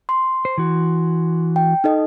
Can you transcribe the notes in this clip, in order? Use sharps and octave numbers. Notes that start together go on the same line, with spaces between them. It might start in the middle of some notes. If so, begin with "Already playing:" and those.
C6
C5
E3 F#4
G5
D#4 A4 D#5